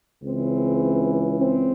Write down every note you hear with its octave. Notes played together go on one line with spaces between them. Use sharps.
C#2 C#3 E3 C4
C4